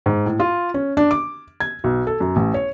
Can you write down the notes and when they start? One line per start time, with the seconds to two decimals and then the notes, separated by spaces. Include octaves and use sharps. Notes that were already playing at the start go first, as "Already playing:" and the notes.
0.06 G#2
0.26 A2
0.40 F4
0.74 C#4
0.97 D4
1.11 D6
1.60 G#6
1.84 B1
2.07 A4
2.20 F#2
2.36 A1
2.54 C#5